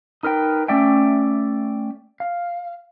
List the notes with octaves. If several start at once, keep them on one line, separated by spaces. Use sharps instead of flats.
D#4 A#4 B4 G5
A3 C#4 D5 E5 G5
F5